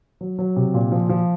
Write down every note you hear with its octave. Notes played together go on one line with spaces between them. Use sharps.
F#3
F#3
C3
A#2
F3
F3